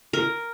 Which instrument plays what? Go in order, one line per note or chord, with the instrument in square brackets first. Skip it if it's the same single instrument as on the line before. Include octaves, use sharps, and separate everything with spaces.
[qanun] A#4